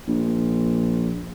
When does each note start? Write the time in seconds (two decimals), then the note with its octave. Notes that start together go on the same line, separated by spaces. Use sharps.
0.08 A#1